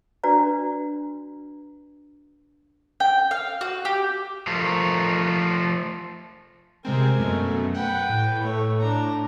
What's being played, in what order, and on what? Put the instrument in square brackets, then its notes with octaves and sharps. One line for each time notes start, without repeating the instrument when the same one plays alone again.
[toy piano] D4 F#4 B4 D5 A#5
[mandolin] G5
F5
F#4
G4
[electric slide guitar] F3 A3 F4 A#4
[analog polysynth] C3 G#3 C4 [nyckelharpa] A#4 G#5
[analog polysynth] F#2 B2 A3
[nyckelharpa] B4 G5 [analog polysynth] F#5
[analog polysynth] A2
[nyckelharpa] A3 C#5
D4 A#5